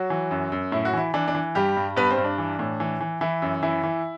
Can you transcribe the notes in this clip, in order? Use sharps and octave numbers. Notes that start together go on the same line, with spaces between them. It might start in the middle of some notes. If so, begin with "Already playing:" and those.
Already playing: F#3 F#4
E3
F#2
F#2
A2 E4
F#4
E3 E4
E3 D4
D4
E3
G2 G3 G4
G2
G2 B3 B4
C4 C5
G2
D4
E3
A2
E3
E3
E3 E4
F#2
E3 E4
E3